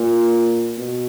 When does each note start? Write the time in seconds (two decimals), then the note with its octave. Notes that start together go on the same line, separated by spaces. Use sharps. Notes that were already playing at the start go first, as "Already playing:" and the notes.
Already playing: A#2
0.78 B2